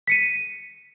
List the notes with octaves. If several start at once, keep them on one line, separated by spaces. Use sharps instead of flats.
B6 C#7 D#7